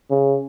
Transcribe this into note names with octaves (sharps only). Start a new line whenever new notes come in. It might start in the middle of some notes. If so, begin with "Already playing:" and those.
C#3